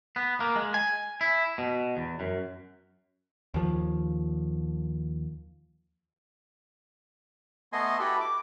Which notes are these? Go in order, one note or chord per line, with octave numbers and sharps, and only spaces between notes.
B3
A#3
G#3
G#5
E4
B2
E2
F#2
D#2 F3
A3 B3 D#5 G#5 C6
E4 F#4 G4 A4 B4
D6